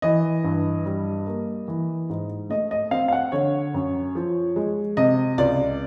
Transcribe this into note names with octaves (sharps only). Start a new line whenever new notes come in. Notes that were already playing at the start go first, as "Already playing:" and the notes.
E3 D#5
G2
G3
A#3
E3
G#2
A3 D#5
D#5
C4 F5
F5
F#5
D3 C#5
F#2
F3
G#3
C3 D#5
C#2 D5